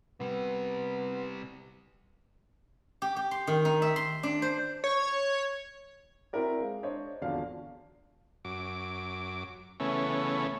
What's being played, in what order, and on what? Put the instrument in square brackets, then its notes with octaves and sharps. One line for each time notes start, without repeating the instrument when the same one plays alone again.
[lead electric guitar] C3 G3 [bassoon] B3
[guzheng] G4
G4
C6
D#3
D#4
E5
C6
D4
C5
[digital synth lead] C#5
[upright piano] C4 E4 F#4 A#4 D5
G#3 F5
D4 C5 C#5 D#5
G#1 E2 D3 F3 F#4 F5
[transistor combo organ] F#2 D6
C#3 E3 A3 B3 C#4